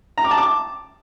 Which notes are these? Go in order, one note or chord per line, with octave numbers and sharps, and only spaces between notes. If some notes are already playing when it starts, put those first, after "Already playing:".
A#5
D6
A5
D6